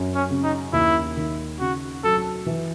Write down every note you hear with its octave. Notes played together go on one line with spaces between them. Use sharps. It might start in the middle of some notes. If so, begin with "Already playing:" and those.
Already playing: F#2
C#4
C#3
D#4
D#2 E4
D#3
C#3 F#4
F#3 A4
E3